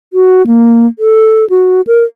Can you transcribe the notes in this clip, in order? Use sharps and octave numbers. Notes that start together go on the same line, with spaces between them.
F#4
A#3
A4
F#4
A#4